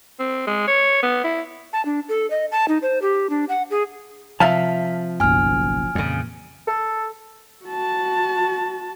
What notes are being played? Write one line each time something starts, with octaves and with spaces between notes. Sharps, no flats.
C4
G#3
C#5
B3
E4
A5
D4
A4
D#5
A5
D#4
C5
G4
D4
F#5
G#4
C3 F3 E5 F5 A5 B6
F#1 B1 G#5 F6
F2 A#2 C#3 E3
A4
F#4 A5